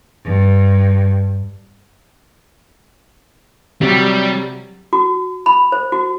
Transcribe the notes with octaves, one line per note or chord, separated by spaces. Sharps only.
G2
C3 F#3 G3
F#4
B5
C5
F#4